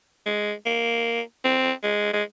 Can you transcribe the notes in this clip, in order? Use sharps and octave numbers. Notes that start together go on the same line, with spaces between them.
G#3
A#3
C4
G#3
G#3